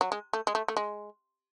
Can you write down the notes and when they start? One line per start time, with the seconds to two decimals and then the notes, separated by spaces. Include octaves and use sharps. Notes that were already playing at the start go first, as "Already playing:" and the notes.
0.01 F#3
0.12 G#3
0.33 A3
0.47 G#3
0.55 A3
0.68 A3
0.77 G#3